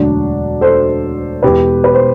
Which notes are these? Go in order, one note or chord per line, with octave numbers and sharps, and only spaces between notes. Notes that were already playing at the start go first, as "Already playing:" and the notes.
Already playing: E1 D2 D3 F#3 D4 F#4
A4 C5
E1 E2 B2 G4 B4
B4
C5